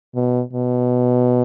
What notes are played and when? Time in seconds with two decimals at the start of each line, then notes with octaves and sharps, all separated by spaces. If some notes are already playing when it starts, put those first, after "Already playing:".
0.15 B2
0.53 B2